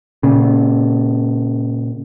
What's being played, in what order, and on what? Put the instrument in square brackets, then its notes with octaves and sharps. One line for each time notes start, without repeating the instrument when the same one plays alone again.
[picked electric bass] A#2 C#3